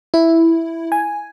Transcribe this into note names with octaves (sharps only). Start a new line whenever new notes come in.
E4
G#5